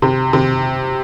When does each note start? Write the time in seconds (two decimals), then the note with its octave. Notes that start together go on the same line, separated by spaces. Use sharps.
0.02 C3
0.33 C3